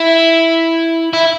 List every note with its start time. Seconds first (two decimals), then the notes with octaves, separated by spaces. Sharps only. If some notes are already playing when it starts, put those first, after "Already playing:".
Already playing: E4
1.13 E4